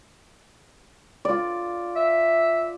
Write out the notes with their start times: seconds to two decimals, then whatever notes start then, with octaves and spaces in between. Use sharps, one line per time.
1.25 F4 D5
1.96 E5